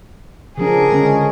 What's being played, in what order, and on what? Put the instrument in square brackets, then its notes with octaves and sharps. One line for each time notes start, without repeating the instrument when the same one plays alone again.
[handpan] C#3 F3 D4 [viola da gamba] G#4 A#4
[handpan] D3 G#3 C#4